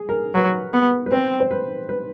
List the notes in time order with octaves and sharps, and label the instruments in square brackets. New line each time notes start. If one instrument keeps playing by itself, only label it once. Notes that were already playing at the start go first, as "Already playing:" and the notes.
Already playing: [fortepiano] G#4
A#4
[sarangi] F#3 [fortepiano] B4
[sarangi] B3
[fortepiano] B4
[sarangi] C4 [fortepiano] C5
[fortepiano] C5
B4
B4